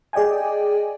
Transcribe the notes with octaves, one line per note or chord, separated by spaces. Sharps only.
G#4 D5 D#5 G5 G#5